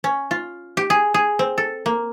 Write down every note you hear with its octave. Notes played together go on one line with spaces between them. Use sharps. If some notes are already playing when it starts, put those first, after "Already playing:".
C#4
F4
G4
G#4
G#4
C4
A4
A#3